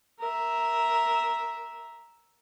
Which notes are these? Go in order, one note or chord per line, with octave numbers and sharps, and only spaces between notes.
A#4 E5